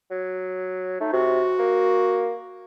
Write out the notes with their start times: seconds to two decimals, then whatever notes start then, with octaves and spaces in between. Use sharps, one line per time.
0.11 F#3
1.00 A3 D#4
1.13 C3 F#4
1.59 A#3